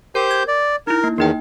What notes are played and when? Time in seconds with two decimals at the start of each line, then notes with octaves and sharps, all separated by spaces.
0.15 G4 A#4 C5 G6
0.31 G#6
0.48 D5
0.87 D#4 E4 A#4
1.04 A#3
1.18 E2 D#3 A#3 D#4 G5